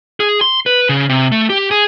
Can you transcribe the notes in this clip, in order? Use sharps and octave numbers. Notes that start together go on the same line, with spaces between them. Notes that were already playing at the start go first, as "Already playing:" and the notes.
G#4
C6
B4
C#3
C3
A3
G4
G#4